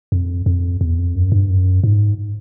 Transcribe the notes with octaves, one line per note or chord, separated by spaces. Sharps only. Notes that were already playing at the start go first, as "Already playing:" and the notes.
F2
F2
E2
F2
F#2
G2
F#2
G#2